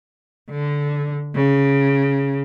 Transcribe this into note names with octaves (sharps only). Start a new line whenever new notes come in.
D3
C#3